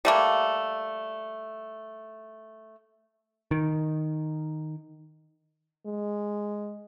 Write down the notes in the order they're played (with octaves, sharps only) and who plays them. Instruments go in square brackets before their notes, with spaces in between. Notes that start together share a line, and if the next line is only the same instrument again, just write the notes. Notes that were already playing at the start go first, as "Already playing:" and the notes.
[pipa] G3 A3 A#3
[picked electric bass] D#3
[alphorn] G#3